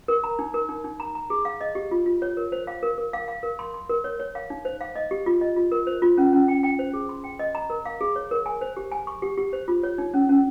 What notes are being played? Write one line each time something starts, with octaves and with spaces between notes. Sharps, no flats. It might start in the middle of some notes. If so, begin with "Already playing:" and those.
A#4
A#5
D#4
A#4
D#4
D#4
A#5
A#5
G#4
F5
D#5
G4
F4
F4
C#5
A#4
C5
F5
A#4
A#4
F5
F5
A#4
C6
C6
A#4
C#5
C#5
F5
D#4
C5
F5
D#5
G4
F4
D#5
F4
A#4
C5
F4
C#4
C#4
G5
G5
C5
G#4
C6
G5
D#5
A#5
A#4
F5
G#4
C#5
A#4
G#5
C5
G4
G#5
C#6
G4
G4
C5
F4
C#5
D#4
C#4
C#4